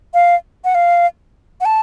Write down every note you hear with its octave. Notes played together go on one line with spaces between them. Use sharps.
F5
F#5
F5
F#5
A5